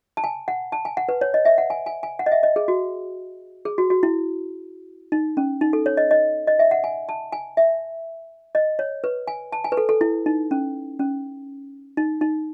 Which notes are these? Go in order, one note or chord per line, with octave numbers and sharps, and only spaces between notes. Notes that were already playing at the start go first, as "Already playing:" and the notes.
A5
G#5
F#5
A5
G#5
F#5
B4
C#5
D#5
E5
F#5
G#5
G#5
G#5
F#5
D#5
E5
D#5
G#4
F#4
G#4
F#4
F#4
E4
D#4
C#4
D#4
A4
C#5
D#5
D#5
D#5
E5
F#5
G#5
A5
G#5
E5
D#5
C#5
B4
G#5
A5
G#5
B4
A4
A4
E4
D#4
C#4
C#4
D#4
D#4